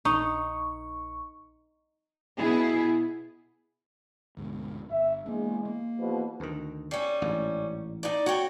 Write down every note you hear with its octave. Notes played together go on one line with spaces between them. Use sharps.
A#1 D#4 C#6
B2 B3 E4 G#4
D2 G#2 B2
G1 E5
E2 G#3 A#3 D4
A#3
E2 B2 F3
D2 D#3
G3 C#4
A1 G#2
D#4 D5
F#4 C#5 G5